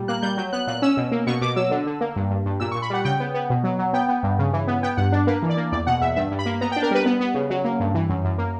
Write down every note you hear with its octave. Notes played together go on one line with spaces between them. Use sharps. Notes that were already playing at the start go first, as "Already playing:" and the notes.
Already playing: A#2 G3
A#3 F#6
G3 G6
F#3 G6
B3 F#6
A#2 F#6
C#4 E6
B2
A#3
B2 C#6
B2 D6
F#3 E6
D3
D3
A#3
G2
G2
G2
A#2 E6
C#6
A#2
B5
G3 F#5
C#3 G5
B3
B3
B2
F#3
F#3
B3 G5
B3
G2
C#3
E3
B3
B3 G5
G2 F#5
D4
A#3 B4
E3
D5
A#3
E2 D5
B2 F#5
E2 E5
G2 E5
G2
B5
A#3
B3 A#5
G5
D4
A#4
G3 B4
B3
B3
C#3
F#3
A#3
G2
E3
F#2
F#2
A#3